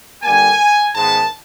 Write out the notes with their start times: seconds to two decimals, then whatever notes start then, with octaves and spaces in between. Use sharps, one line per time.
0.23 D3 G3 A#3 G#5
0.95 G#2 D#3 G#3 B3 A5